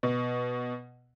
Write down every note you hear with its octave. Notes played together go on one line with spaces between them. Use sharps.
B2